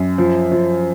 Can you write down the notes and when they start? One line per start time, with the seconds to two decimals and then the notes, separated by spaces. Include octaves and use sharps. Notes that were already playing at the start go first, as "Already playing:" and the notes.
Already playing: F#2
0.18 F3
0.52 F3